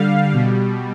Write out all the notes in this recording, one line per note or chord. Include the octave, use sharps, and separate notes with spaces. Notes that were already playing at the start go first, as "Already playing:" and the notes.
Already playing: D3 G3 F5
B2 G3